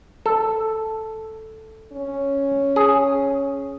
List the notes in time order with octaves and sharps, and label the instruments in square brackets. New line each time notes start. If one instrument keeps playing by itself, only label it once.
[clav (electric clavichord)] A4
[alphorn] C#4
[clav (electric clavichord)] G#4